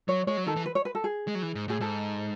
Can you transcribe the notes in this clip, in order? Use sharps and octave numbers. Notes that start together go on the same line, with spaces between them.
F#3 C#5
G#3 C#5
F#3
D#3 A4
E3
B4
C#5
B4
A4
G#4
G#3
F#3
E3
G#2
A2 G#4
G#2 A4